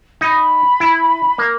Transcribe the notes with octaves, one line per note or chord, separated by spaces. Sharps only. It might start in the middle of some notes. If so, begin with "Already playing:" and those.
D#4 B5
E4
A#3 A#5